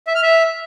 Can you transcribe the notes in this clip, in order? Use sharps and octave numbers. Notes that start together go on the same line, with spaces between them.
E5
F6
E5